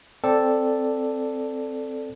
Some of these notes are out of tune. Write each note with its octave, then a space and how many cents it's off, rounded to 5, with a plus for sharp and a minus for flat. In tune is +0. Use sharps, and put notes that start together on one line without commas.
C4 +0 A4 +0 D5 +0